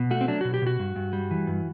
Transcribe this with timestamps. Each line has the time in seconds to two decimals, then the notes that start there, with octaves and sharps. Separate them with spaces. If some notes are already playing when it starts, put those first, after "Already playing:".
Already playing: B2
0.11 A3 F#4
0.21 C4
0.28 F#3 D4
0.41 B2 F#4
0.54 G4
0.62 B2 F#4
0.79 G2
0.96 G2
1.13 G3
1.31 E3
1.47 G2